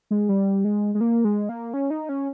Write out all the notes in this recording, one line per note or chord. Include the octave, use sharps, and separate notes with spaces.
G#3
G3
G#3
G#3
A#3
G#3
A#3
C#4
D#4
C#4